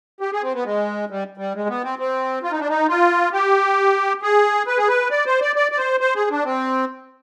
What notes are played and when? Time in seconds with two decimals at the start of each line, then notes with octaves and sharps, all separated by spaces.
0.20 G4
0.32 G#4
0.43 C4
0.54 B3
0.65 G#3
1.10 G3
1.37 G3
1.55 G#3
1.69 B3
1.84 C4
1.99 C4
2.43 F4
2.51 D#4
2.60 D4
2.69 D#4
2.89 F4
3.33 G4
4.22 G#4
4.67 B4
4.77 G#4
4.88 B4
5.11 D5
5.26 C5
5.41 D5
5.56 D5
5.72 D5
5.78 C5
6.00 C5
6.15 G#4
6.30 D4
6.45 C4